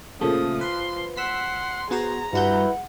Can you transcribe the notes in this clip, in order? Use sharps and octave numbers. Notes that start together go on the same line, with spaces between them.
A#2 C#3 F3 A3 D#6
B4 C6
F#5 C6 E6 B6
B3 F#4 G#4 C5 A#5
G2 E4 F#4 B4 F#5 G6